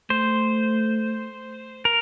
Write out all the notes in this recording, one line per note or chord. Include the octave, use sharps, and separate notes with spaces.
A3 C5
A#4